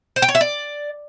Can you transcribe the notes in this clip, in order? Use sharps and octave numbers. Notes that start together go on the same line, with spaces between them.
C5
G5
C#5
E5
D5